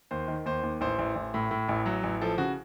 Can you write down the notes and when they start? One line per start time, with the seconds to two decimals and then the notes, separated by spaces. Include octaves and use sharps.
0.11 D#2 C5
0.28 D#3
0.46 D#2 C5
0.63 D#2
0.81 A1 C5
0.99 A1
1.16 A1
1.34 A2
1.51 A2
1.69 A1
1.86 F#3
2.03 A1
2.22 F3 A4
2.38 C#3 F#4